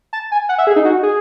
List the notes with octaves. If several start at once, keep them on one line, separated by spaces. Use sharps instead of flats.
A5
G#5
F#5
E5
G#4
D#4
F#4
G#4